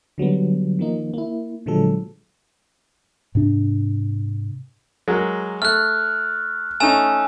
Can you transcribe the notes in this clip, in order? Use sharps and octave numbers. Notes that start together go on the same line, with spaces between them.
D3 F#3 G3 B3
D#3 F3 A#3 D#4
A#3 E4
A#2 D3 F3 F#3 G#3 A4
G#2 C3 D4
F#3 G#3 A#4
A3 F6 F#6
A3 C#4 D#4 G#5 E6 E7